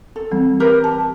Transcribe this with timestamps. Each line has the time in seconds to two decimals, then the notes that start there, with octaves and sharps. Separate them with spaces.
0.16 A4
0.31 E3 G3 C4
0.60 G4 A#4 B4
0.84 A5